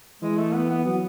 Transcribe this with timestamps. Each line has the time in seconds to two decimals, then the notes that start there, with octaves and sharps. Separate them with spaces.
0.21 E3 G#3
0.38 A3
0.54 B3
0.69 B3
0.85 F#3 B3